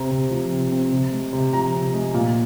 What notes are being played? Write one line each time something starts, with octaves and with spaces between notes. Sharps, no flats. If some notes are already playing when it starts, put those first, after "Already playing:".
Already playing: C3 C4 A#5
C3
F3
C3
C4
C3
G#3
C3
F3 A#5
C3
G#3
A#2